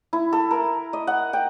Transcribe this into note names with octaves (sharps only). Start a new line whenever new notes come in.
E4
A4
A#4
D#5
F#5
G5